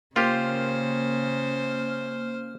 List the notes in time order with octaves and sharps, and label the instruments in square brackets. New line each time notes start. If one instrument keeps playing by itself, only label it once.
[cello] C#3 [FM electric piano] A#3 C#4 F6 [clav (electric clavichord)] F4 G4 [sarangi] C5